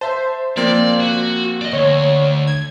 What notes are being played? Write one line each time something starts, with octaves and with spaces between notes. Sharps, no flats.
C5 E5 A5
F3 A#3 C4 D5
F#4
D5 D#5
D2 C#5
G#6